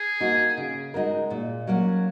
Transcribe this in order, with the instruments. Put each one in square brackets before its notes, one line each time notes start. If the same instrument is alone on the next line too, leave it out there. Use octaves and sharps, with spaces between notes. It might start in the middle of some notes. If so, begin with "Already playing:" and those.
Already playing: [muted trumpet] G#4
[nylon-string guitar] A#3 D#4 F#4
C#3
G#3 D#4 F#4 A#4
A#2
F#3 A#3 C#4 F#4